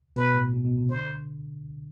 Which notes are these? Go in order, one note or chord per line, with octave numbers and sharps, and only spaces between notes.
B2 B4
A2
B2
B2
C3
D3 C5